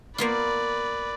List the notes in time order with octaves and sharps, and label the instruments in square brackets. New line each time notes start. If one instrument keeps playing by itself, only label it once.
[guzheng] A#3 B3 F4 [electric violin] B4 D5